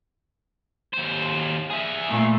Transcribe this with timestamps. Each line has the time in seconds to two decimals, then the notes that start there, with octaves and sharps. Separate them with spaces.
0.93 D#2 C5
1.70 G#4 E5
2.07 A#2 A3